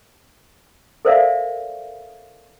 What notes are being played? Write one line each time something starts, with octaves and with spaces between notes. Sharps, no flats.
A4 A#4 C5 D5 E5 F5